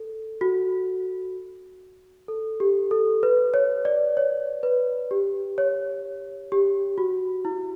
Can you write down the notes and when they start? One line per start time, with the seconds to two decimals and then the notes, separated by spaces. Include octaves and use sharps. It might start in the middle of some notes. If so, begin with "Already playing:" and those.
Already playing: A4
0.41 F#4
2.28 A4
2.60 G4
2.91 A4
3.23 B4
3.54 C#5
3.85 D5
4.17 C#5
4.63 B4
5.11 G4
5.58 C#5
6.52 G4
6.98 F#4
7.45 E4